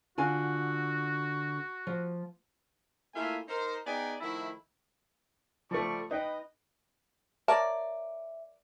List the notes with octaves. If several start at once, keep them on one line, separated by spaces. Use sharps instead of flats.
D3 F4 F#4 G#5
F3
A3 A#3 E4 F4 E5 G#5
D#4 A#4 C5
B3 D#4 G#4 D5 G5 G#5
D#3 F3 A3 E4
F3 G3 A3 D5 C#6
D#4 B4 D#5 G5
A#4 C#5 D5 E5 A5